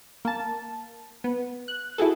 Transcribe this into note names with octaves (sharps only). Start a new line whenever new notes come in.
A#3 A5
B3
F#6
E4 F#4 G#4 A4